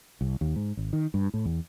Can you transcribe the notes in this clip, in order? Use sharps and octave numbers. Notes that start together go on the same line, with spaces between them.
C2
D#2
G#2
G#1
D#3
G2
A2
E2